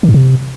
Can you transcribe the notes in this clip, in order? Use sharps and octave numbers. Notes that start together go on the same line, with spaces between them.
D#3
G#2
C3